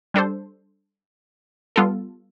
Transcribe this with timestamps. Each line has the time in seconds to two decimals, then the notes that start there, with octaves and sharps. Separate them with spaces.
0.14 G3 D4 A4 C5
1.76 G3 B3 F4 A4